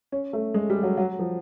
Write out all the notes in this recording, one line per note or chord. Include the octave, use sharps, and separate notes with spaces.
C#4
A3
G#3
G3
F#3
F#3
F3